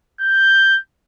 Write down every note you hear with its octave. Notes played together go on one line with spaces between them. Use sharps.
G6